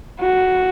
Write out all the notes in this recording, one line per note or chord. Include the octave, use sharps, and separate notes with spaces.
F#4